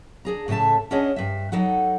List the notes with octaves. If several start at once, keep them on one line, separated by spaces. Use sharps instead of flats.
D4 G#4 A#5
A2 C#3 A4 E5 A5
C#4 D4 G#4 C#5 D#5 F#5
G2 E5
F#3 D#4 A4 F#5